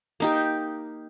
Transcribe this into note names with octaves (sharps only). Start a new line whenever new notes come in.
A#3 D#4 G4